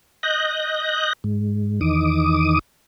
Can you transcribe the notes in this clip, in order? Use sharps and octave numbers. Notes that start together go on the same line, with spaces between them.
D#5 F#6 G6 A#6
G#2
E2 D#3 D6 D#6